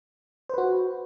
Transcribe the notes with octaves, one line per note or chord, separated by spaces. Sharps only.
F#4 B4 C5